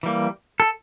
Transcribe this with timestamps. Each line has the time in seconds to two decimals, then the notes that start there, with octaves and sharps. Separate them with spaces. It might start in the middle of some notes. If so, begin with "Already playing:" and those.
0.03 E3 G3 A#3
0.60 A4